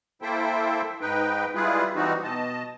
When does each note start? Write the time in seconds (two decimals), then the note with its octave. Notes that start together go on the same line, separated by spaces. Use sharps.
0.22 A#3 E4 A4 C5 E5 G5
1.01 G#2 D#4 B4 G5
1.55 G3 G#3 E4 F4 G#4 B4
1.95 E3 G3 C4 D#4 F#4
2.23 B2 D#5 A5